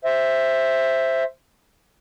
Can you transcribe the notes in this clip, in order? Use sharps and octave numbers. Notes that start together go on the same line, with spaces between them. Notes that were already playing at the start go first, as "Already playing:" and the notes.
C5 E5